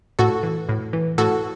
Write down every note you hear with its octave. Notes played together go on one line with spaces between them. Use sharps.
A2 F#4 A4
E3
A2
E3
A2 F#4 A4